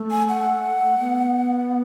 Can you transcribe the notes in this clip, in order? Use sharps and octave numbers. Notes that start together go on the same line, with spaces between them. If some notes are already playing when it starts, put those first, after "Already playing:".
Already playing: A3
G#5
F#5
B3